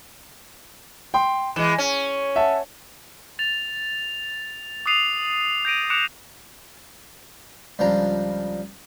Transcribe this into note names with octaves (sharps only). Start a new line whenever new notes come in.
G5 C6
E3 G#3 E7
C#4
E5 F#5 A5
A6 F7
D6 D#6 F#6 C7 D#7 F7
G6 A#6 D7 D#7
D6 F#6 C#7 D7 E7 F7
C#2 F3 G3 D4 A#5